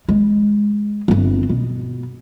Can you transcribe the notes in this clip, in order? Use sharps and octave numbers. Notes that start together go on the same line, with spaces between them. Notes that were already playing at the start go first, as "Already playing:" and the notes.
G#3
G1 C4
B2